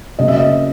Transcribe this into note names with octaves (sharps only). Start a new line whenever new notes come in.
C#3 F#3 A#3 D#5
E5
D#5